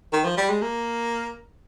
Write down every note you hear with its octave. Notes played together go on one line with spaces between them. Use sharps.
D#3
F3
G3
G#3
A#3